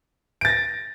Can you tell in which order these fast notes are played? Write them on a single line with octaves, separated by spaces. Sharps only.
D7 A6 A#6